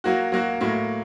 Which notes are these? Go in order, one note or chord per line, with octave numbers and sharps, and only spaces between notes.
F#3 A#3 F#4
F#3 A#3 F#4
A2 F#3 A#3